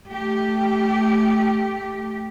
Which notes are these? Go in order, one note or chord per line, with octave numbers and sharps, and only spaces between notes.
A3 G4